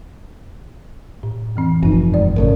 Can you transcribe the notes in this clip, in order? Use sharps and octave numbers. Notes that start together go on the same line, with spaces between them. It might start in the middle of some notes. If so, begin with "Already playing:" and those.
A2
F2 E3 C4
F1 G2 F3 D#4
A2 G#3 D5
G#1 A2 C#3 A#4